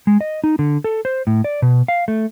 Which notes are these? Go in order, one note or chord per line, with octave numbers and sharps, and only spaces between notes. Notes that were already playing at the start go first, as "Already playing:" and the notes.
G#3
D#5
D#4
D3
A4
C5
A2
D5
B2
F5
A3